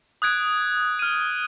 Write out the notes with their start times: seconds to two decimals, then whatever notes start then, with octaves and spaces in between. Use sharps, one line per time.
0.22 D#6 F#6 G#6 D7
0.99 F6 D#7